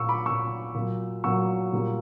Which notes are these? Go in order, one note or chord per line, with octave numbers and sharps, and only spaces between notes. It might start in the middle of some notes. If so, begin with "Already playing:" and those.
Already playing: A#2 A#3 C#6 E6
B5 D6
A#2 A#3 C#6 E6
A#2 F#3 A#3
A#2 F#3 A#3 C#6 E6
A#2 G3 A#3